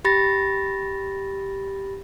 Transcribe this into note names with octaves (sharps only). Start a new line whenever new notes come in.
G4 B5 A6 A#6